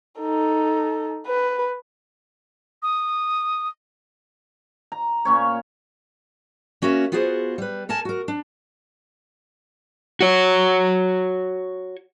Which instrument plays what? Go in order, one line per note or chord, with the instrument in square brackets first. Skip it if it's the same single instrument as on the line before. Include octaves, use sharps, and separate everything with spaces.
[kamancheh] D#4 A4
B4
[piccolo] D#6
[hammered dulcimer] A#5
A#2 C#4 C#5
[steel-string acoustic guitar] A#3 C#4 F#4 A#4 E5
B3 F4 F#4 G#4 B4 C5
G3 B4
A4 A#4 G#5 A5
F#4 A#4
D4
[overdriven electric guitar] F#4 C#5